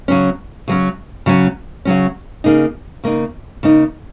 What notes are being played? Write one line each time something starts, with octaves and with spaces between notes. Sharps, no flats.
C#3 F#3 C#4
C#3 F#3 C#4
C#3 F#3 C#4
C#3 F#3 C#4
C#3 A#3 D#4
C#3 A#3 D#4
C#3 A#3 D#4